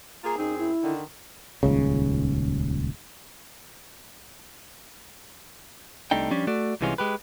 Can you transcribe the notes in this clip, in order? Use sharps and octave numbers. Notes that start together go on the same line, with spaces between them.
A#3 F4 G#4 A#5
F#2 C4 D#4 G#4
E4
D3 D#3
D#1 C#2 C#3
C2 C3 A3 D4 D#4 G5
F3 G3 C#4 D4
A3 F#4 D5
C2 C3 E3 G#3 C#4 F4
G#3 G4 B4